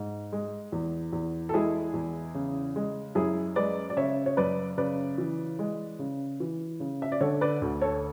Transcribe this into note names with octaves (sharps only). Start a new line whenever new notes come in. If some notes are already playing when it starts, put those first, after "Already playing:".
Already playing: G#2
G#3
E2
E2
A4
G#3 E4 G#4
E2
C#3
G#3
F#2 E4 G#4
G#3 B4 D5
D5
C#3 C#5 E5
C#5
F#2 B4 D5
C#3 B4 D5
E3
G#3
C#3
E3
C#3
E5
D5
D3 A4 C#5
B4 D5
D2
A4 C#5